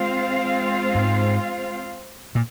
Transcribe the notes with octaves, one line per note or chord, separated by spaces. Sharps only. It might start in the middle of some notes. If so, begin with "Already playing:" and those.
Already playing: G#3 C4 F4 C5 F5
G#2
A#2